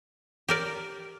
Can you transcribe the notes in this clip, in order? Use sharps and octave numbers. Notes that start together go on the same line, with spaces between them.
G4 A#4 D5